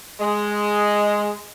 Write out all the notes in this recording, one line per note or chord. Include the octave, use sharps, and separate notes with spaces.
G#3